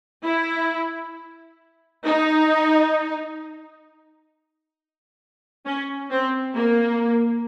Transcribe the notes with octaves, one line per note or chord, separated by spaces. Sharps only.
E4
D#4
C#4
C4
A#3